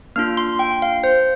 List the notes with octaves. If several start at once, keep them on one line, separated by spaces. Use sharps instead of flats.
A#3 D4 F4 F6
C6
G5
F5
C5